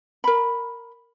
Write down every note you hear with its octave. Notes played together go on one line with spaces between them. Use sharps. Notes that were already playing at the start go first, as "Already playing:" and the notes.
A#4 B5